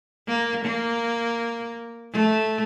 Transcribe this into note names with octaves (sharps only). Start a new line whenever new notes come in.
A#3
A#3
A3